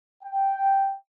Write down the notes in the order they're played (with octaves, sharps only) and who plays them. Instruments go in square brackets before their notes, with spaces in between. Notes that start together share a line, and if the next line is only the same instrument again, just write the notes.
[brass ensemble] G5